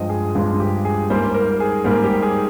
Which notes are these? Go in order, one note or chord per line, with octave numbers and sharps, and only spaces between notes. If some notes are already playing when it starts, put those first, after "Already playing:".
Already playing: G2 F3 G#3 D#5 G5
G#4
G2 F3 G#3 G#4
G4
G#4
G#2 G3 A#3 C5
A#4
G#4
G#2 G3 A#3 A#4
G4
G#4